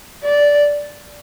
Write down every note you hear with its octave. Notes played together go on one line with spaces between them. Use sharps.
D5